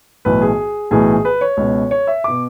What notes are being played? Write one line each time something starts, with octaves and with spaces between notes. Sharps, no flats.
B1 A2 E3 B4
G#4
B1 A2 E3 G#4
B4
C#5
C#2 B2
C#5
E5
B2 D6